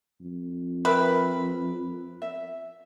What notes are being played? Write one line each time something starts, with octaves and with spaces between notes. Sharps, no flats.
F2
A#4 B4 E5 G5
E5